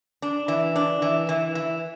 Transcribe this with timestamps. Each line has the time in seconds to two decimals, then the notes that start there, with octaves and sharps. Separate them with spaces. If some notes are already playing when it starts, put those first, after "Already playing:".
0.22 D4
0.48 E3
0.76 D4
1.02 E3
1.29 E3
1.55 E3